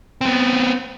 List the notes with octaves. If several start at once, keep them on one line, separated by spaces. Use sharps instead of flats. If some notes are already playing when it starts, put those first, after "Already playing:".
B3 C4